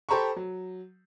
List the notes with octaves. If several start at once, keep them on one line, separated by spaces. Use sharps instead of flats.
G4 A4 C5 A#5 B5 C#6
F#3